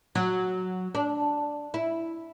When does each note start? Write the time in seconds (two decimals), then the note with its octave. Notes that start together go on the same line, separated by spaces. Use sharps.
0.15 F#3
0.95 D4
1.74 E4